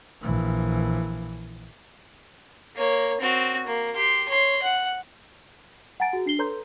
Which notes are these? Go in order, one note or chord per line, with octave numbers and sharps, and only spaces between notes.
A#1 E3
A#3 C#5
C4 F#4
A#3
G4 C6
C#5 C6
F#5
F#5 G#5 A#5 A6 D7
F#4 G#4
D4 C7 G7
A4 B4 C#5 A#5 C6 G6